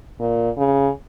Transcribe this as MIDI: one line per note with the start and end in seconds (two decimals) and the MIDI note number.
0.20 0.50 46
0.58 0.90 49